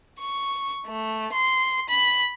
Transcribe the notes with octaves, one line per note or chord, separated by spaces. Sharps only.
C#6
A3
C6
B5